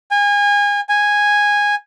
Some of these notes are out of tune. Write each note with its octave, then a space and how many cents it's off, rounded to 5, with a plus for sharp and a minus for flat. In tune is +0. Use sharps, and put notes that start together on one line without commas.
G#5 -30
G#5 -10